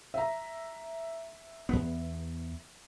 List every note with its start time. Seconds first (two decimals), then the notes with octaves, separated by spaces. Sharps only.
0.14 E5 A#5
1.69 E2 B3